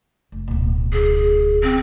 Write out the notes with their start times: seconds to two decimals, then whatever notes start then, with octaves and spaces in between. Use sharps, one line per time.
0.32 F1
0.48 D1 B2
0.93 G#4
1.63 C4